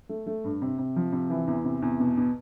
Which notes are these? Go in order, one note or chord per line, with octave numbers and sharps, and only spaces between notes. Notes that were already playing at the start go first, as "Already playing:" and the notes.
A3
A3
G2
C3
C3
F3
C3
E3
E2
C3
E2
B2
B2